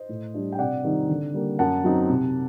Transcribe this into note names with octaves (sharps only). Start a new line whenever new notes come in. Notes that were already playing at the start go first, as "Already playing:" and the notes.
Already playing: C5 D#5
A2
G3 D4
G5
C3 D5 F#5
D#3 G3 C4 D#4
D3
G3 A#3
F#2 F#5 A5
F#3 C4 D#4
C3